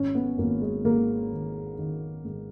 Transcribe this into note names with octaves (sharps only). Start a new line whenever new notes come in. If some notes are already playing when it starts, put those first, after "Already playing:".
Already playing: G#1 C#4
B3
G#1 A#3
G#3
G#2 A#3
D#3
D#3
G#2